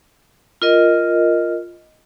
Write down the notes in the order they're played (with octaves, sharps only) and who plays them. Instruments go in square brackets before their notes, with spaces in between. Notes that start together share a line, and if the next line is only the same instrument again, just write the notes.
[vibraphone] F4 A#4 D#5